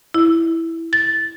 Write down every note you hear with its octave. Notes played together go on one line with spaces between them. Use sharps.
E4
A6